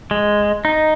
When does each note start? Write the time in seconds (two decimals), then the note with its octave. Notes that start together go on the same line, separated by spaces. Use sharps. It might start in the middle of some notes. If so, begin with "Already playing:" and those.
0.11 G#3
0.65 D#4